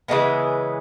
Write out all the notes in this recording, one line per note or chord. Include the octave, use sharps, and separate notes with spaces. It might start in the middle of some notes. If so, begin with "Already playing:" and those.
C#3 E3 G#3 B3